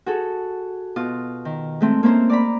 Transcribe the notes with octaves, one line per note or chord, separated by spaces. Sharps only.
F#4 G#4 A4
B2 F4 D#6
D#3
G#3 A3 C4
A#3 C4 C#4 C5
D5 A#5 B5